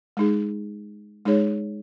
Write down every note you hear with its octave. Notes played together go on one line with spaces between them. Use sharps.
G#3 D#4 G#4
G#3 D#4 G#4 C#5